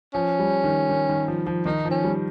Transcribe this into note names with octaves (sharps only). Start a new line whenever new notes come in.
F3 C#4
G3
D#3
D#3
D#3
F3
F3
D#3 D#4
F3
C#4
G3